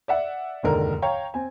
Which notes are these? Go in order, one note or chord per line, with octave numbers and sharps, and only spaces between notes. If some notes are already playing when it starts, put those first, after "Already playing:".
D5 E5 F#5
F1 D#2 G#2 D3 A#4
C#5 F5 G5 A#5
C4 G#5